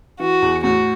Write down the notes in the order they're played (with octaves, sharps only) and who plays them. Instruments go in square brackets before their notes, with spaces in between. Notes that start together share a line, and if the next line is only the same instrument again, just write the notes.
[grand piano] E3 [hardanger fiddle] F#4
[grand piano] E2
[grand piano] A2 [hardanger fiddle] F#4